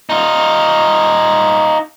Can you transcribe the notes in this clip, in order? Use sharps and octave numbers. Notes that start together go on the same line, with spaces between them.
D#4 F4